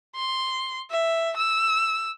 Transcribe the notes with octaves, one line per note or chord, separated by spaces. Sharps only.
C6
E5
E6